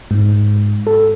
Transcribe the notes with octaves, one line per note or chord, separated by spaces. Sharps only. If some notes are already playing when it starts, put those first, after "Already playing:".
G#2
A4